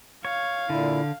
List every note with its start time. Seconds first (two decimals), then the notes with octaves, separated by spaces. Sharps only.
0.25 C#5 F5
0.70 A#2 D3 E4